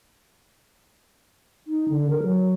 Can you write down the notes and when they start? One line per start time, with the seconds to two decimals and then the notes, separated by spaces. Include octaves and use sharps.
1.67 D#4
1.89 D3
2.10 A#4
2.23 F#3